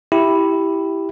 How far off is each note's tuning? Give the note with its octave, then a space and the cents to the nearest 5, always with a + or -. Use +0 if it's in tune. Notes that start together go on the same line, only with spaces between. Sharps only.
E4 +0 G4 +0